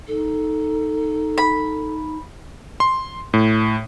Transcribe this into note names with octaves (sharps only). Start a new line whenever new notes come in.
D#4 A4
B5
C6
A2